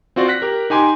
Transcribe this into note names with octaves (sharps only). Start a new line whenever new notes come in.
C4 F4 F#4 D5
F#6 A#6 B6
G4 A#4
D#4 G4 G#5 C6 D6